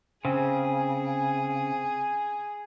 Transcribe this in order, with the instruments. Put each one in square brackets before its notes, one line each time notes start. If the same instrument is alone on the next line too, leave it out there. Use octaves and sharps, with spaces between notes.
[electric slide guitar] C#3 [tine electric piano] C4 [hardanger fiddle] G#4